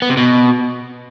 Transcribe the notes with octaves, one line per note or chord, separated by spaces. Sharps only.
B3
C3
B2